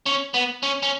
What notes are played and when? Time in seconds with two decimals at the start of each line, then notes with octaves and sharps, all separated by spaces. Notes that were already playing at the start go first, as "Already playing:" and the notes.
0.06 C#4
0.34 B3
0.63 C#4
0.83 C#4